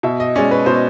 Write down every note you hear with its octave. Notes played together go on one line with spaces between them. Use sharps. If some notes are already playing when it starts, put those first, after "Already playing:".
B2 E5
D#5
G#3 C#4 D5
B4
B2 C5